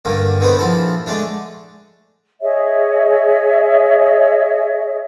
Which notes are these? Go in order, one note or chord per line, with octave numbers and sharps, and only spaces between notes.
G2 D3 D#3 A#3
D3 D#3 B3 D#4 B4 C5
A#1 F3 E4 A4
D3 G#3 A3 D4
G#4 C#5 D#5 E5